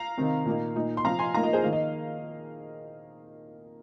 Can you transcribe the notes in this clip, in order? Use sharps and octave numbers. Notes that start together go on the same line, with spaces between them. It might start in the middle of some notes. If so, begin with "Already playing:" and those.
Already playing: F5 A#5
C3 D#3 C4 D#4
A#2 A#3 D#4
A#2 A#3 D#4
C6
C3 F3 C4 F5 A#5
G#5 C6
F3 A#3 D#4 F5 A#5
A#4 D#5
G#4 C5
D#3 A#3 D#4 F5
D#5